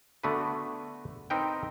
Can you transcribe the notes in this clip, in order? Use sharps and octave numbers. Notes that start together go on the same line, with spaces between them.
D3 A3 B3 D4 F#4 B4
C4 D#4 A#4 B4 G5